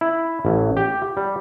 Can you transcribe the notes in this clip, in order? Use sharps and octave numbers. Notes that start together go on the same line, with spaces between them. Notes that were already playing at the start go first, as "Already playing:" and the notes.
E4
A1
G4
G3